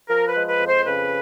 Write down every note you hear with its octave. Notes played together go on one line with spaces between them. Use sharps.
F3 A#4
B4
G#3
B4
F2
C5
C#3 B4